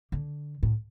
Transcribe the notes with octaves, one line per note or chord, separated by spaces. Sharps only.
D3
A2